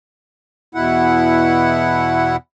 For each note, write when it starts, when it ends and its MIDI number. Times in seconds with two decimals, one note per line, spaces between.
0.75 2.36 40
0.75 2.36 47
0.75 2.36 64
0.75 2.36 78